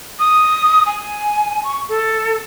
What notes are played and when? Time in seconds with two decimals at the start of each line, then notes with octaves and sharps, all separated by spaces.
0.19 D#6
0.86 G#5
1.64 C#6
1.89 A4